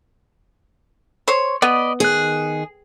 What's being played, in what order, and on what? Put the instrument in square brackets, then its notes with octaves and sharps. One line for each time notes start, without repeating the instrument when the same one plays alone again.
[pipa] C5 C#5
[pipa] B3 [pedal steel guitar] D5 D#5 B5
[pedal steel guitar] D#3 F#6 [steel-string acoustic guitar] G#4